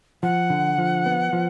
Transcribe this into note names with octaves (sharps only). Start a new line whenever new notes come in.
F3 F#5
D3
F3
B3
F3